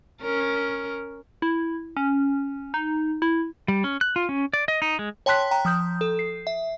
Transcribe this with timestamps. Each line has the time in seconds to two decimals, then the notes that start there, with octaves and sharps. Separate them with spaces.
0.22 C#4 A#4
1.42 E4
1.97 C#4
2.74 D#4
3.22 E4
3.68 G3
3.84 C#4
4.01 F#6
4.16 F4
4.29 C#4
4.53 D5
4.68 D#5
4.82 D#4
4.99 G#3
5.26 C#5 G5 A5 C6 F#6 B6
5.51 G5 A#5
5.65 F3 D#6 G6
6.01 A4
6.19 C7
6.47 E5